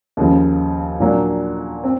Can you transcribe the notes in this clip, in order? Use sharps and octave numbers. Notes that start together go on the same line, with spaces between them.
D#2 C#3 F3
A#2 F#3 A#3 D4
C4